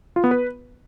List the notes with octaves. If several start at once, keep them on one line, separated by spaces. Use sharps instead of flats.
F4
B3
B4